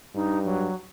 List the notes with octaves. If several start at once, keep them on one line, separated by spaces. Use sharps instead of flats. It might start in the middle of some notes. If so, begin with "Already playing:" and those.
G2 D#4
F#3